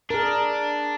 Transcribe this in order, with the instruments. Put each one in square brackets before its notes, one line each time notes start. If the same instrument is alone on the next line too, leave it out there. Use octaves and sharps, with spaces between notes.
[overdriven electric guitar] D4 [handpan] G#4 A#4